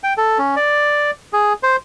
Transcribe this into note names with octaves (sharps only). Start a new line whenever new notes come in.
G5
A4
C#4
D5
G#4
C5